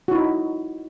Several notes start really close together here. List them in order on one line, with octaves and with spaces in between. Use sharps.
F#4 E4 D#4